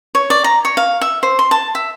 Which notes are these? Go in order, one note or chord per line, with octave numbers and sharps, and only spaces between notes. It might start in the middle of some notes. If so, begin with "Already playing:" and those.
C#5
D5
A#5
C#5
F5
E5
C5
C6
A5
E5